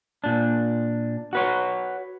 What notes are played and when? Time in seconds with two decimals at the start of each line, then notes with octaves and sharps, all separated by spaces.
0.24 A#2 D4
1.33 F#4 B4 C#5